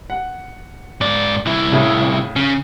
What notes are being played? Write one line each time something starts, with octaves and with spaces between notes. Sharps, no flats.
F#5
G#2 D5
C2 E4
A2 C#3
C#3